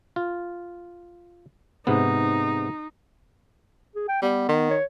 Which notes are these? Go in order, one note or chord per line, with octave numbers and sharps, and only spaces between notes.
F4
G#2 C3 B3 D#4
G#4
G5
G3 B3
D#3
C#5